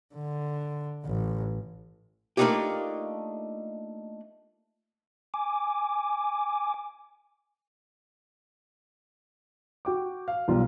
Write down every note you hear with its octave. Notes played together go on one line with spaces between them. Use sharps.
D3
A1
A3 A#3 D4 D#4 F4 G4
G#5 D6
F#4 G5 D6
F5
B1 G3 F4